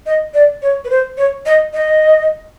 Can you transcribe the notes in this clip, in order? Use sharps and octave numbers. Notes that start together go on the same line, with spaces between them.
D#5
D5
C#5
B4
C5
C#5
D#5
D#5